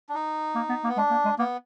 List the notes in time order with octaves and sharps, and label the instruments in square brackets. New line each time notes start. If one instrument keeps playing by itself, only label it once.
[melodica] D4
D#4
[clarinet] A#3
B3
A#3
[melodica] B3
[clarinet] G#3 [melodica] D4
[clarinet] A#3
G#3
[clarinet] A#3 [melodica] B3